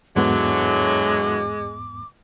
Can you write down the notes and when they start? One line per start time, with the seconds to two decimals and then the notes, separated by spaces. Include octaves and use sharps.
0.16 E2 G#2 D3 E3 F#3 G#3 B3 D6